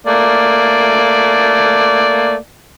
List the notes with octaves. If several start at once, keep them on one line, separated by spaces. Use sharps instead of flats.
A3 A#3 D5